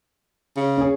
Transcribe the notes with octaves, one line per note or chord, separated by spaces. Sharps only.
C#3
C#4 G#4